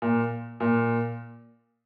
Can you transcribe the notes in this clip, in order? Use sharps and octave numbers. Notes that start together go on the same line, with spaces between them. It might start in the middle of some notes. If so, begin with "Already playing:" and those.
A#2
A#2